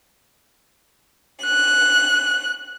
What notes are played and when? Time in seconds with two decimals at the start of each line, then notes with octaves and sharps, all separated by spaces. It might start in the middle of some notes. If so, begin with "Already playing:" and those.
1.43 F#6